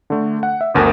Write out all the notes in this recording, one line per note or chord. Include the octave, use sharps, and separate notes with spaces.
D3 A3
F#5
E5
G1 D2 A#4 A5 D#6